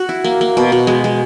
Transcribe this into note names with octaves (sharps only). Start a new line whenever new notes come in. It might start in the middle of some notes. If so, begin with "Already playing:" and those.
Already playing: F#4
E4
A#3
A#3
B2
B2
G#3
G#3